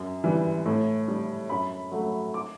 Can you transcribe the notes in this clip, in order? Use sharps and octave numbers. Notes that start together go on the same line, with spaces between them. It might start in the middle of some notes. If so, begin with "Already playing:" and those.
Already playing: F#2
E3 G3
A2
G3
F#2 B5
F#3 A3
D6